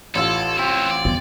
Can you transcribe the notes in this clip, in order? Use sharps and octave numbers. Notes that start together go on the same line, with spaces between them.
A1 F4 A4 E6
F#3 C4 E4
D5
E2